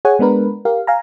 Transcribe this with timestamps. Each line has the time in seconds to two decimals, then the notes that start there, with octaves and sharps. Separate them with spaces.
0.05 G#4 C#5 F#5 G#5
0.19 G#3 B3 D4 A#4 B4
0.65 G4 A#4 F5
0.87 F5 G#5 A#5